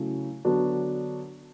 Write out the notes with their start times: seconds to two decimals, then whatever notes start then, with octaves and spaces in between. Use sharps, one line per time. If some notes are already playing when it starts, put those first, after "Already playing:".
Already playing: C#3 F#3 A3 E4
0.44 D3 F#3 B3 D4 F#4